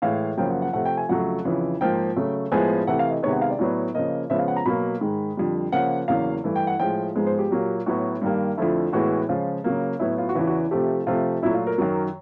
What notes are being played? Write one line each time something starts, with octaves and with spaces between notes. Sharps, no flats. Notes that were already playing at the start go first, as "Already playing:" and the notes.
A2 E3 G#3 F5
F#2 C#3 F3 A#3 G5
F#5
F#5
C3 F3 A3 F#5
G5
G#5
F2 C#3 F#3 A3 F#5
F2 C#3 E3
G#2 F3 A#3 G5
C#3 F#3 A3
A2 F3 G#3 B3 G#5
C3 E3 A3 F#5
F5
D#5
C3 D#3 G#3 B3 C#5
F#5
F5
D5
A2 F#3 B3
C#3 F3 A#3 D#5
C#3 F3 G#3 B3 E5
F5
F#5
A#5
B2 F#3 A#3 B5
G#2 D#3 G#3
F2 D3 G3
C#3 F3 A#3 F#5
E2 C#3 F#3 A#3 F5
G2 E3 A3
G5
F#5
A2 F3 G#3 G5
G#2 F3 G#3 B3
C5
G4
A#2 F#3 A#3
A2 F#3 B3 F#4
G2 D#3 G3 A#3
F2 D3 F3 A3 E4
A2 E3 G#3 B3 F#4
C#3 F3 G#3 F4
C#3 F#3 A#3
A2 F#3 B3 E4
F4
F#4
E2 C#3 E3 F4
F#4
C3 F3 A3 G4
C3 F3 A3 F4
A#2 F#3 A3 E4
F4
A#4
F#2 D#3 F#3